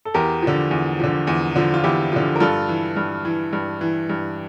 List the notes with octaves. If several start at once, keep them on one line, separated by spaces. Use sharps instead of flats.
A4
E2 G4 A#4
D3 F3
E2
D3 F3
E2
D3 F3
F4
E2 E4 G4
D3 F3
A#4
G2 F4 A4
E3
G2
E3
G2
E3
G2